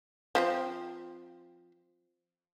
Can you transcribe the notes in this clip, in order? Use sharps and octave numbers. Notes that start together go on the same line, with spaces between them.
F3 C4 F4